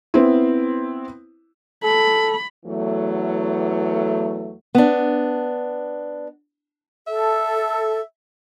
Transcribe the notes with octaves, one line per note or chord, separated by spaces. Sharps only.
B3 C4 E4
A4 B5
E2 E3 F#3 A3
B3 D4
A4 E5